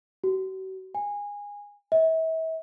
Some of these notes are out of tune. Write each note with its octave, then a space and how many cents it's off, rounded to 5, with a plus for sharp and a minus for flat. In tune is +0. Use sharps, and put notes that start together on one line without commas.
F#4 +40
G#5 -20
E5 -40